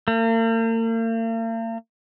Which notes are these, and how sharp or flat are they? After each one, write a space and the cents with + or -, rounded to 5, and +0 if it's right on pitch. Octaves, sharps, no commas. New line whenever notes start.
A#3 -45